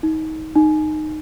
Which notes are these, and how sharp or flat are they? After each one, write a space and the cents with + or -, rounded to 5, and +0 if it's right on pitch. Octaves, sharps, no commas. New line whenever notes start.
D#4 +25
D#4 -15